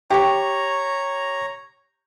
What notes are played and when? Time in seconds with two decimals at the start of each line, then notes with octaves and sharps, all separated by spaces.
0.10 G4 C#5 A#5 C#6